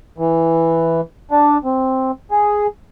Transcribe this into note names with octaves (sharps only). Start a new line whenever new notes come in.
E3
D4
C4
G#4